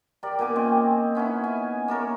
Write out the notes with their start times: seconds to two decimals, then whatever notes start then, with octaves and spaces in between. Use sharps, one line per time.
0.23 G4 A#4 D5
0.39 A#2 B3 G#5 D6
0.56 C4 C#4 D#5
1.15 B3 C#4 D#4 E4
1.44 G#5
1.88 A#3 A4 A#4 C#5